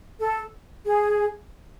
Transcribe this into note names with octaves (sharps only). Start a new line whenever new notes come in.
A4
G#4